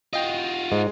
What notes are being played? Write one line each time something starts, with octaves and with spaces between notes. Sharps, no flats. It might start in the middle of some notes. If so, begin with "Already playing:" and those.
F4 F#4 D#5 G5 A#6
G#2 G#3